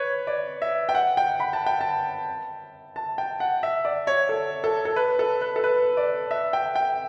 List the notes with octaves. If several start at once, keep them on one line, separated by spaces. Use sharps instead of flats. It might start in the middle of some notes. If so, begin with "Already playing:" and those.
Already playing: B4 C#5
D5
E5
G5
F#5
G5
B5
A5
G5
A5
A5
G5
F#5
E5
D5
C#5
A4
A4
A4
B4
A4
B4
A4
B4
D5
E5
G5
G5